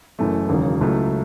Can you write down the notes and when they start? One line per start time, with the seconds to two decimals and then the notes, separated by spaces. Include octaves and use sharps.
0.19 F#1 F#2 E3 A3
0.49 E1 D#2 C#3 F#3
0.81 C#2 C#3 F#3 A3 E4